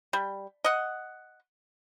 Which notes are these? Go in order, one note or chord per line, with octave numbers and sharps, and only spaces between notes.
G3
D#5 F#5